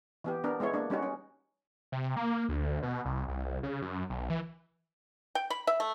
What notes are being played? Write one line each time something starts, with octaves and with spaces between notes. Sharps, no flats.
E3 B3 G4
B3 D4 A#4
G#3 B3 E4 C#5
A#3 D4
G3 C#4 D#4 F#4
C#4
C3
A#3
D2
B2
C2
C2
C#3
F#2
B1
E3
G5
B5
E5
A3